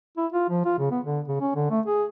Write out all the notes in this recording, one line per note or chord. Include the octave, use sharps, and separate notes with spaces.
E4
F4
F3
F4
C#3
B3
D3
C#3
C#4
D3
A3
G#4